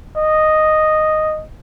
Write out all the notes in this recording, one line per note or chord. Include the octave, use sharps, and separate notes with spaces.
D#5